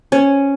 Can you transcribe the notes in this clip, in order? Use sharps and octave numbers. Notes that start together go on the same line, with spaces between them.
C#4